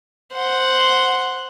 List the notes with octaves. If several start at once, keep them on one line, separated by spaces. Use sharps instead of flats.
C5 F#5